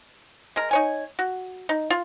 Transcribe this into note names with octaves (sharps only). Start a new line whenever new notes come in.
G#3 A#4
D#4 C#5 G#5
F#4
D#4
F4